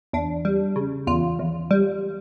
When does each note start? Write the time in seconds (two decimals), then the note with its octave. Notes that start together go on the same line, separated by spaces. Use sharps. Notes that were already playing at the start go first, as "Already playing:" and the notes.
0.13 E2 D4
0.45 G3
0.76 C#3
1.07 E2 F4
1.39 E2
1.71 G3